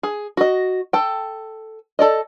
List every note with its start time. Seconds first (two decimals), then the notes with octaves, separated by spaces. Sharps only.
0.03 G#4
0.37 F#4 D#5
0.93 A4 G5
1.99 A4 D5 D#5